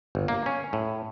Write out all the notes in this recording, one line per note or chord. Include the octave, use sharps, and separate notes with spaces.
G1
A#3
C#4
A2